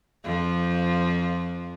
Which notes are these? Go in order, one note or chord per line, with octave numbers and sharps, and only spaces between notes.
F2 F3